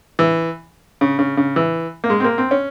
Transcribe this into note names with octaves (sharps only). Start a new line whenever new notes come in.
E3
C#3
C#3
C#3
E3
A#3
G#3
C4
A#3
C4
C#4